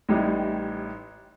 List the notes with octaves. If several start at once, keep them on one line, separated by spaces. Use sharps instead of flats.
A1 A2 G3 D#4